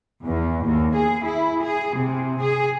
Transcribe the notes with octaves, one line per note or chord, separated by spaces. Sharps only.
E2
D#2
G#4
E4
G#4
C3
G#4